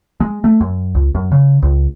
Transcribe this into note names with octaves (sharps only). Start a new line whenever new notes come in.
G#3
A3
F#2
C#2
F#2
C#3
C#2